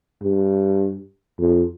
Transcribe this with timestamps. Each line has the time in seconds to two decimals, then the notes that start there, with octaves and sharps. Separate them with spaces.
0.22 G2
1.39 F2